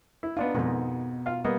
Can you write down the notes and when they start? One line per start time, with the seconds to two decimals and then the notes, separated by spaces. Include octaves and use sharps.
0.23 E4
0.37 B3 D4 D#4 F4
0.54 F2 G#2 B2 D#3 B3
1.26 F4 F5
1.45 G3 A#3 B3 D#5